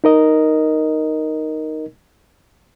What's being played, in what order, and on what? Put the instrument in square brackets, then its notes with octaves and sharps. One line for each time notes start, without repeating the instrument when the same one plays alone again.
[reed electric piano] D#4 A#4 D#5